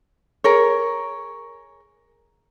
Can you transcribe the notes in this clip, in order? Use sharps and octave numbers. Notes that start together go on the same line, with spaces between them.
G#4 A#4 C#5